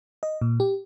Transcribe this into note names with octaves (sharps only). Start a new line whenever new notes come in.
D#5
A#2
G4